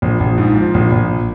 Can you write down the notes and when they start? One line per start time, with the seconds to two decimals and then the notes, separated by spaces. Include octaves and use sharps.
0.02 A#1
0.20 A#1
0.38 G#2
0.56 F3
0.74 A#1
0.92 A#1